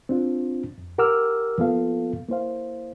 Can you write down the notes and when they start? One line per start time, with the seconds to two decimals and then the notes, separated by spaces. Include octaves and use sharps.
0.09 C4 D4 F4
0.78 F2
0.98 G4 A#4 F#5 D6 E6 F6
1.58 F3 A#3 B3 F4 A4 F5
2.29 A#3 E4 C5 F5